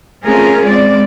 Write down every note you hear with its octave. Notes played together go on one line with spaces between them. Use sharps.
A3 C4 C#4 F4 G#4 A#4
G#3 C4 D5